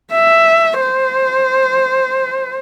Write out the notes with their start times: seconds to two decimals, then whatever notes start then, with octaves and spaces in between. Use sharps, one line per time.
0.13 E5
0.81 C5